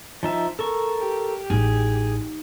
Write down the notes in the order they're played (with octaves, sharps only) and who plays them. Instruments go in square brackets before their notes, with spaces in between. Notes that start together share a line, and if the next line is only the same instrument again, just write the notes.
[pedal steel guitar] F3 D#4 E5
A4 A#4 C#6
[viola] G4
[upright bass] A1 [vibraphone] D#4 [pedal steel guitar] G#4